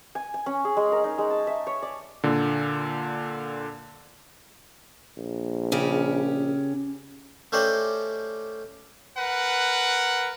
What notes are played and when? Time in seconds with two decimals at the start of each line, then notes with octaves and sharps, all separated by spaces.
0.15 G#5
0.34 G#5
0.46 C#4
0.65 G#4
0.77 G#3
0.92 A#4
1.04 D#4
1.18 G#3
1.31 A5
1.47 E5
1.67 C#5
1.82 D5
2.24 A#2 D3
5.17 A#1
5.72 C#3 C#4 G4
7.52 A3 C#4 G4 C5 D5 D#5
9.18 A#4 B4 F#5